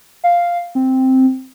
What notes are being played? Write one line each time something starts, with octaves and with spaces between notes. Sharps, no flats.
F5
C4